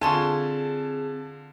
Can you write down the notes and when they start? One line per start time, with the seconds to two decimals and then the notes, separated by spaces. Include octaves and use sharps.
0.01 D3 C4 F4 G#4 G#5 A5 C6 C#6